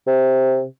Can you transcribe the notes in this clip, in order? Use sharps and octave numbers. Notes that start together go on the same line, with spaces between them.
C3